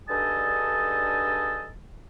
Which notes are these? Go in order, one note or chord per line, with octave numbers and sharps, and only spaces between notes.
G2 D3 D#4 G#4 A4 A5